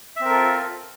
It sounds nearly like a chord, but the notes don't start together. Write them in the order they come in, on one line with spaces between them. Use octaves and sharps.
E5 C4 A#4 A4 F4